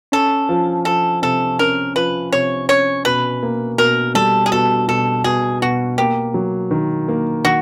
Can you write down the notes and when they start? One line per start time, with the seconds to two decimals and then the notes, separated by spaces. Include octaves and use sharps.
0.12 C#4 A4
0.49 F3
0.85 F3 A4
1.22 C3 A4
1.59 C#4 A#4
1.96 F3 B4
2.32 C3 C#5
2.68 C#4 C#5
3.05 B2 B4
3.43 A#3
3.78 B2 A#4
4.15 G3 A4
4.46 G#4
4.52 B2 A4
4.88 B2 A4
5.24 B2 G#4
5.62 B2 F#4
5.98 A#3 G4
6.34 F#3
6.71 D#3
7.08 A#3
7.45 D#3 F#4